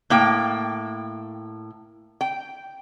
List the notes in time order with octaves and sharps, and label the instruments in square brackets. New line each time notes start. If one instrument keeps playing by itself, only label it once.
[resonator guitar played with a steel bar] A2 A#3 G5
G5